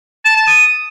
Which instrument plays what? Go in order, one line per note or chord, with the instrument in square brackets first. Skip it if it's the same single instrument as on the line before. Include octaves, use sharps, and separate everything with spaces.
[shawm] A5
A5
D#6